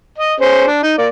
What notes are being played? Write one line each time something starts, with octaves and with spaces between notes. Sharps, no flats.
D#5
C#4 G#4 C5
D4
D#4
A#3 D5